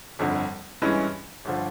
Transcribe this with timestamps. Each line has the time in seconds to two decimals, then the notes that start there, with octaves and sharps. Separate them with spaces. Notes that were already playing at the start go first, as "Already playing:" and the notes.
0.19 G1 F2 D3
0.82 G2 E3 G#3 C#4 E4
1.45 G1 D3 F3